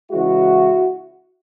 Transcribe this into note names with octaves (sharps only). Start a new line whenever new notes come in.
C#3 E3 G#3 E4 F#4